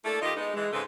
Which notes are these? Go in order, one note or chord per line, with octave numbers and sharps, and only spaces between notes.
A3 A#3 D4 E4 A4
D#3 F4 G4 D#5
G#3 B3 D#4
E3 G#3
G#2 C#3 C4 A4 B4